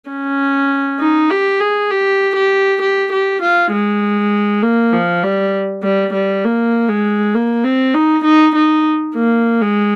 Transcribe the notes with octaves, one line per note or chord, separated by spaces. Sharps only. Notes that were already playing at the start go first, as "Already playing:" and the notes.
C#4
D#4
G4
G#4
G4
G4
G4
G4
F4
G#3
A#3
F3
G3
G3
G3
A#3
G#3
A#3
C4
D#4
D#4
D#4
A#3
G#3